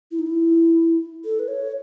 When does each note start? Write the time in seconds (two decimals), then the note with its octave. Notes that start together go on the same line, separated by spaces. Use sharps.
0.11 E4
0.19 D#4
0.27 E4
1.25 A4
1.39 B4
1.48 C#5